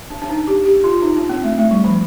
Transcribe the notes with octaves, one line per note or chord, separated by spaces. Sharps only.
D4
D4
D#4
G4
G4
F4
D#4
D4
C4
A3
A3
G3
F3